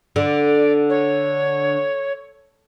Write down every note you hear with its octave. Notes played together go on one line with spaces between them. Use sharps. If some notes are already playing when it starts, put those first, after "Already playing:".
D3 D5
C#5